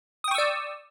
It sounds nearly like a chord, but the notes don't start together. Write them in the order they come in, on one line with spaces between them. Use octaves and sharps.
D#6 G5 C#6 E6 D5